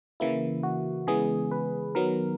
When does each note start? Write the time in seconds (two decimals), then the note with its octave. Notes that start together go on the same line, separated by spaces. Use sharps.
0.20 C#3 E3 A#3 E4
0.63 F#4
1.07 C#3 E3 G#3 B3 G#4
1.51 B4
1.95 D#3 F#3 B3 A#4